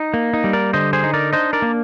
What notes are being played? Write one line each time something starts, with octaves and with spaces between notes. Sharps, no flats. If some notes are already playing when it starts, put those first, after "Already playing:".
Already playing: D#4
A#3
D#4
G3
A#4 D5
D3 C5 D#5
G#4 C5
D#4
A#4 D5
D4 C5 D#5
A#4 D5
A#3